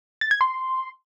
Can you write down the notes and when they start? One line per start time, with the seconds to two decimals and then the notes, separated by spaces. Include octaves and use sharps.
0.21 A6
0.31 G#6
0.41 C6